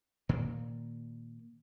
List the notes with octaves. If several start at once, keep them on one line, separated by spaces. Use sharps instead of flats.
A#2 D#3 A#3